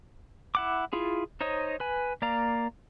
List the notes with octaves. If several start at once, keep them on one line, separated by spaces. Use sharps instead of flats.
E4 F#5 D6
E4 F4 G#4
D#4 C5 C#5 D#5
B4 G#5
A#3 D5 F5 A#5